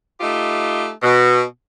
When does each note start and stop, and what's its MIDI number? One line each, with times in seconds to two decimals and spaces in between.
0.21 0.89 57
0.21 0.89 63
0.21 0.89 65
0.21 0.89 67
1.03 1.42 47